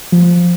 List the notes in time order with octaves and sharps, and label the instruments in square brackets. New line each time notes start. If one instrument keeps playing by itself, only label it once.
[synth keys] F3